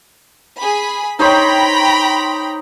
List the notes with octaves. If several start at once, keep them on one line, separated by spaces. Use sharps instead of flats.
G#4 B5
D#4 C5 C#5 G5 A#5 B5